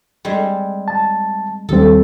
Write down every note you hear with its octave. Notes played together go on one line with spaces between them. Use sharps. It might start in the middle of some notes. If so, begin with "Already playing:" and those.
G3 G#3 C4
A5
D#2 G3 C4 A4